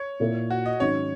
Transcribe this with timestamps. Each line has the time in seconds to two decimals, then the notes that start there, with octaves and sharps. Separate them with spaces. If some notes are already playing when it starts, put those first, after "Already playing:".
Already playing: C#5
0.20 A#2 A#3 E4
0.50 F#4
0.66 D#5
0.80 G#2 D#3 F#3 C#4 C#5